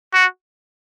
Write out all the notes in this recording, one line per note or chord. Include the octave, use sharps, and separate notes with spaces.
F#4